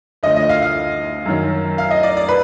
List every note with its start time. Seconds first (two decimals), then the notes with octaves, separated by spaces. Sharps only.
0.23 D2 D3 F3 D#5
0.36 D#5
0.49 F5
0.62 F5
1.25 F#2 D#3 F#3
1.78 F5
1.91 D#5
2.03 D5
2.17 D5
2.29 B4